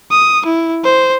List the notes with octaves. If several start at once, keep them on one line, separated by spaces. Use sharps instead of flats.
D#6
E4
C5